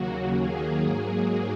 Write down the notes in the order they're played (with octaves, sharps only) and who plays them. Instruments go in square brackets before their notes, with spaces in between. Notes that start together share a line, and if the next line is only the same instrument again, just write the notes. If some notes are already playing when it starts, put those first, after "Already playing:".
Already playing: [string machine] D#2 C#3 F#3 A#3 F#4
D#2 D#3 F#3 A#3 G#4
G#2 F#3 A#3